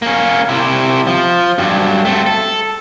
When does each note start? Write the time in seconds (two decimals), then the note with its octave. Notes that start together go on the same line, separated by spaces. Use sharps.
0.02 A#3 C#4
0.49 C3 E4
1.07 F3
1.58 G2 F#3
2.05 A3 C4
2.26 A4